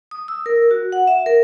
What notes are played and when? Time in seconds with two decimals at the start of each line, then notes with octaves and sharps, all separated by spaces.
0.11 D#6
0.28 E6
0.46 A#4
0.71 F#4
0.92 F#5
1.07 E5
1.26 A#4